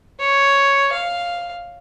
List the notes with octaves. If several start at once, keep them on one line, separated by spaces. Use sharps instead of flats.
C#5
F5